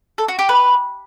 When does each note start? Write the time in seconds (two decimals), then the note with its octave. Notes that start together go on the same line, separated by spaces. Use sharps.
0.18 A4
0.28 F#4
0.39 G4
0.49 B4